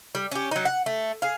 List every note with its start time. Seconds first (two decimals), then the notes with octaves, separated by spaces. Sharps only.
0.15 G3
0.32 C#4 G4
0.51 F#3 D#4
0.65 F#5
0.86 A3
1.22 G#4 F5